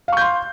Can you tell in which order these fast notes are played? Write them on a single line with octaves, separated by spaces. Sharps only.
F5 C#6 G6 C6